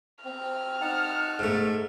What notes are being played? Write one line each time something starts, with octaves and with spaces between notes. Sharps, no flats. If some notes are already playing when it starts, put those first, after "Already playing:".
C4 F6
D#4 F#5 A5
G#2 A3